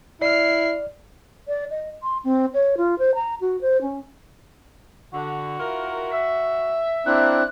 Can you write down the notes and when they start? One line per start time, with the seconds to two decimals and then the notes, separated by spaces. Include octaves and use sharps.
0.22 E4 D5 F6 C7
1.48 D5
1.71 D#5
2.03 C6
2.24 C4
2.54 C#5
2.77 F4
2.99 C5
3.15 A#5
3.41 F#4
3.61 C5
3.82 C#4
5.14 D3 F#4
5.58 E4 F4 A#4
6.12 E5
7.06 A#3 C4 D4 E4 F#6